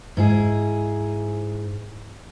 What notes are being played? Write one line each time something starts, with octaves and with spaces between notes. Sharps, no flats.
G#2 E4 G#4